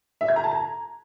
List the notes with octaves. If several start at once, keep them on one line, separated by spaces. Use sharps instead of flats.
E5
G#6
A#5
A5
A#5